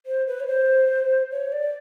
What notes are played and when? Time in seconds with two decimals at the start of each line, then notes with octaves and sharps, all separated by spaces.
0.06 C5
0.27 B4
0.40 C#5
0.47 C5
1.31 C#5
1.52 D5